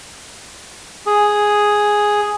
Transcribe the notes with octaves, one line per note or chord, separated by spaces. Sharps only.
G#4